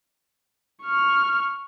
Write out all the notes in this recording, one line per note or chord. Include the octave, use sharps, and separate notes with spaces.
C#6 F6